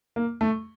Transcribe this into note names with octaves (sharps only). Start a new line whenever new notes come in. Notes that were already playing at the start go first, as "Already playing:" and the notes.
A#3
A3